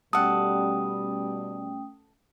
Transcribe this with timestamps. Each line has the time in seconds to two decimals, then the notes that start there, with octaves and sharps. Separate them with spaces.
0.13 B2 G3 A3 C#4 A4 F#5 G5 D#6